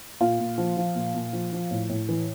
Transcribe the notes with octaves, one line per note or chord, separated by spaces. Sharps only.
A#2 F4
A#2
F3
F3
A#2
A#2
F3
F3
A2
A2
E3